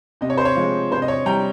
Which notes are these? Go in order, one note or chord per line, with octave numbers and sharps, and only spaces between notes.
C3 D#5
C#5
C5
C#5
F3 G#3
C3 C5
D#5
C#5
G3 G5 A#5